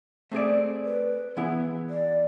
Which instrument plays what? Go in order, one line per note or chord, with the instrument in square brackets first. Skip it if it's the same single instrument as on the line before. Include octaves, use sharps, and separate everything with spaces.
[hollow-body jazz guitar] A3 C4 G#4 D5
[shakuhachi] B4
[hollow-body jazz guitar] E3 B3 E4 G#4
[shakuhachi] D5